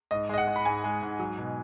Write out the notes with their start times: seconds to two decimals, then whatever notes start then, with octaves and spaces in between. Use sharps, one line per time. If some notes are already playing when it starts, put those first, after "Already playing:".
0.11 G#2 D#5
0.29 G#3 D#5
0.38 F#5
0.47 G#3
0.56 B5
0.65 G#2 G#5
0.84 G#3
1.02 G#2
1.19 F#3
1.38 B2